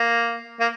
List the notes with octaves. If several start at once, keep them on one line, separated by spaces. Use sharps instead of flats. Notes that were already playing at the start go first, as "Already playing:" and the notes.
Already playing: A#3
A#3